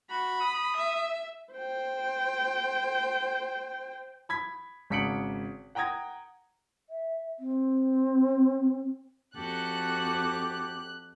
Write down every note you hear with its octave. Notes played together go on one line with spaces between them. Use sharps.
F#4 B5
D#6
E5
C5 G5
B5 G#6 B6
G#1 C#3 B6 C#7 D7 F#7
F#5 G5 A#5 D#6 G#6 A#6
E5
C4
F2 F#4 G4 A4 F#6